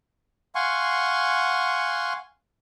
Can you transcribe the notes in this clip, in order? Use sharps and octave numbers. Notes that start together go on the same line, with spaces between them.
F5 F#5 G#5 C6 C#6